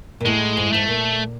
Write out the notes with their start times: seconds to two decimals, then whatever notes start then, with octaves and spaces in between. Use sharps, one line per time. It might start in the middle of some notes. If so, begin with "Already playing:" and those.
0.21 A#2
0.25 A2 G#3
0.57 G#2
0.66 A2
0.72 G#2 A3
0.88 A#2